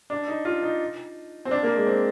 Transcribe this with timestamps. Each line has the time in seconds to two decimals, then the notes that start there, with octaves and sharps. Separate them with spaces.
0.10 D4
0.27 D#4
0.45 F4
0.63 D#4
1.45 C4
1.51 D4
1.63 A#3
1.75 G#3
1.87 C4